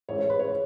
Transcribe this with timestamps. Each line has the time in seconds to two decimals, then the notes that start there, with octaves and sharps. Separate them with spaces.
0.09 A1 G#2 G#3 C#5
0.19 C#5
0.30 B4
0.39 C#5